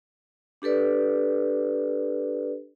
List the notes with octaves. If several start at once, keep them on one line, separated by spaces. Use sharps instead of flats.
D4 G4 A4 B4 D5